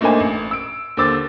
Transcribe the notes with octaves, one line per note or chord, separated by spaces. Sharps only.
A3 A#3 D4 D#4 C5 G#5
A1
E6 D7
D#2 D3 C5 D6 E6 A6